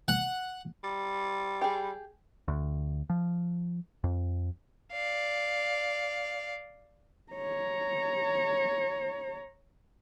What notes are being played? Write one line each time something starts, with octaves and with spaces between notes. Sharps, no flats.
F#5
G3
G4 G#4
D2
F3
F2
D5 F5
C#5 A#5